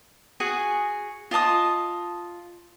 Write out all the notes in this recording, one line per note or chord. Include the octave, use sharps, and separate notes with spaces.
F#4 G#4 G#5
F4 D#5 A5 D#6